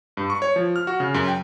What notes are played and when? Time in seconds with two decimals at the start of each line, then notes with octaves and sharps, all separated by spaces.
0.17 G2
0.30 C#6
0.42 C#5
0.56 F3
0.76 F6
0.87 F#4
1.00 C#3
1.14 F#2
1.28 G5